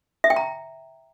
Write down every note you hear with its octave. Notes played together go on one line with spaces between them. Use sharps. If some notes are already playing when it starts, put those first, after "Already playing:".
E5
G5
A#5